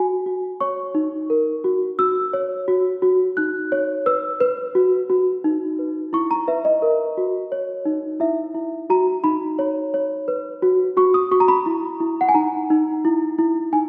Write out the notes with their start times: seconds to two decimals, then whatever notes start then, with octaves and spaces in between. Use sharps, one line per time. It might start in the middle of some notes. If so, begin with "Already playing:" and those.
Already playing: F#4 G#5
0.26 F#4
0.60 C#5 C#6
0.95 D#4
1.30 A#4
1.64 F#4
1.99 F#4 E6
2.33 C#5
2.68 F#4
3.02 F#4
3.37 D#4 F#6
3.72 C#5
4.06 B4 E6
4.40 B4
4.75 F#4
5.10 F#4
5.44 D#4
5.79 B4
6.13 E4 C#6
6.31 A#5
6.48 B4 E5
6.65 D#5
6.82 A#4
7.17 F#4
7.52 C#5
7.85 D#4
8.20 E4 E5
8.55 E4
8.90 F#4 A#5
9.24 D#4 B5
9.59 C#5
9.94 C#5
10.28 B4
10.62 F#4
10.97 F#4 C#6
11.14 D#6
11.31 F#4 C#6
11.40 A#5
11.48 B5
11.66 E4
12.00 E4
12.21 F#5
12.29 G#5
12.34 D#4 A#5
12.70 D#4
13.05 E4
13.38 E4
13.73 D#4 G#5